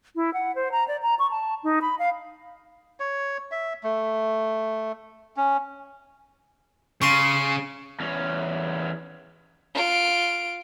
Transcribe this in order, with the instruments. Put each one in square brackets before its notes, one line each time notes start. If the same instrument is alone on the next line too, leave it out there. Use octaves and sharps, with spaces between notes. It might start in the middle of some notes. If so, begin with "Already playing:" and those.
[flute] E4
F#5
C5
A#5
D5
A#5
C#6
A5
D#4
B5
F5
[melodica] C#5
E5
A3
C#4
[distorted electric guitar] C#3 [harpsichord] C6 C#6
[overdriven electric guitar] E2 C#4
[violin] F4 D7